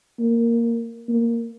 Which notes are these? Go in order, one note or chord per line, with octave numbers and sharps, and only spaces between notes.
A#3
A#3